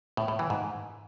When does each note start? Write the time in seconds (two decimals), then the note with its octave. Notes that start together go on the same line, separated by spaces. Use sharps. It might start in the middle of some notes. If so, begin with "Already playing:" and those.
0.17 A2
0.28 A2
0.39 E3
0.50 G#2